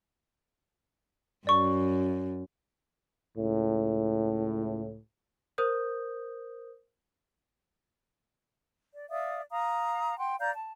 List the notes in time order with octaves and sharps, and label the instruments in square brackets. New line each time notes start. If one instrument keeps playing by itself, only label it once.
[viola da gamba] F#2 [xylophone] D5 C#6
[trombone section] C#2 A2
[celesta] A#4 C5 D#6 G6
[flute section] D5
D5 E5 F5 D#6
F5 A#5 D#6
F#5 G5 C6
D5 F5 A#5 G6
A5